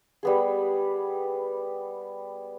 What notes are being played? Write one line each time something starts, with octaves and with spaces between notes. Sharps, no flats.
G3 B3 G#4